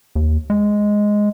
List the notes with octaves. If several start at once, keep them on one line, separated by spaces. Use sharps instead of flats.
D#2
G#3